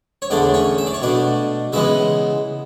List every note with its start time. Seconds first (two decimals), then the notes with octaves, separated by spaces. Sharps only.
0.22 C#5
0.30 E2 D3 A3 D4 D5
0.54 C#4 C#5
0.78 E5
0.87 D5
0.94 C#5
1.02 B2 A3 D4 D5
1.72 C#3 E3 G#3 B3 E4 E5